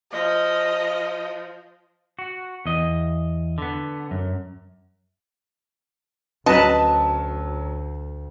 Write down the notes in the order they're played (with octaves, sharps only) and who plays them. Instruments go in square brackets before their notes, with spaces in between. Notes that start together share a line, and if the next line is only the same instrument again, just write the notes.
[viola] F3 [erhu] D#5
[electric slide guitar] F#4
E2 D#5
D3 B3
F#2
[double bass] D2 [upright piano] F#3 C#4 [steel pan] B4 D#5 [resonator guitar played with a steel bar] A5